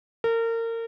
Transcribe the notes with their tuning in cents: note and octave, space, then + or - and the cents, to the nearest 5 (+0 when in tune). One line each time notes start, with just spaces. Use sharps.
A#4 -30